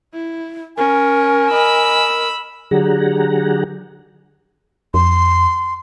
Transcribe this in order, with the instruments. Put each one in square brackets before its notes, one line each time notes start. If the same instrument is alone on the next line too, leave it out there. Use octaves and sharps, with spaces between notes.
[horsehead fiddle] E4
[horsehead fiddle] C#4 [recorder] A#4 [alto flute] G#5
[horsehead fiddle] D#5 [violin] B5 E6
[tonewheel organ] D3 F#3 G4 G#4 F#5 A#5
[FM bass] F2 [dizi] C6